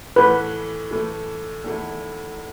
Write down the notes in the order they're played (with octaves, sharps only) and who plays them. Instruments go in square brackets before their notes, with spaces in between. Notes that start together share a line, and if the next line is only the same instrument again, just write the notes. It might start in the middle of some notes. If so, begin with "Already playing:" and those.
[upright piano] A2 E3 A3 [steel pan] B4
[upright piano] A2 E3 A3
E2 D#3 A3 E4